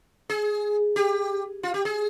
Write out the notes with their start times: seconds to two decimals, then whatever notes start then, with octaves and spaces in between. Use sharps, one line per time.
0.30 G#4
0.96 G4
1.63 F4
1.74 G4
1.85 G#4